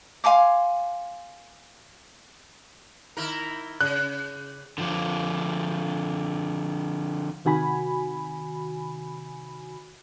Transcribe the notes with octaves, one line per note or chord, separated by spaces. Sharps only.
F5 G#5 C6 D6
D#3 E4 A#4
C#3 F#6
D3 F3 D4
C3 D#3 F#4 G#5 B5